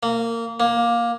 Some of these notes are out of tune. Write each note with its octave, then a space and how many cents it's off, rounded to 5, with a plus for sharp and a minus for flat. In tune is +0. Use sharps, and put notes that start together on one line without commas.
A#3 -20
A#3 +15